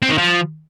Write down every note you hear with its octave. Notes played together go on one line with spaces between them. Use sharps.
C4
D#3
F3